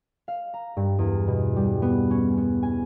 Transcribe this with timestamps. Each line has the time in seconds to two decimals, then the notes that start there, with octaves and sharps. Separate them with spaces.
0.28 F5
0.54 A#5
0.77 G2
0.99 E2
1.28 B2
1.56 G3
1.82 B3
2.10 C#4
2.37 B3
2.63 G#5